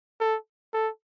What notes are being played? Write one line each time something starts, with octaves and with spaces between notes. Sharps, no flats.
A4
A4